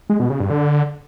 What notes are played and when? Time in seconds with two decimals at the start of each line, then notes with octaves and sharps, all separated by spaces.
0.10 G#3
0.20 B2
0.30 C#3
0.40 G2
0.50 D3